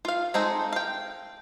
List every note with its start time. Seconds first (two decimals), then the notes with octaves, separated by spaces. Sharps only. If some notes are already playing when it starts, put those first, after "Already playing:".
0.05 F4 F5
0.34 G#3 C4 D#4 A4
0.73 F5 G5